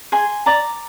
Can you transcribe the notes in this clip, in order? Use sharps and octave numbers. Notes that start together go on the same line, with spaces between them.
G#4 G#5 C6
D5 A#5 D6